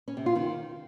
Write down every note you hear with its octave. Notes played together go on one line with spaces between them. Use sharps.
C#4
C3
F4
D#3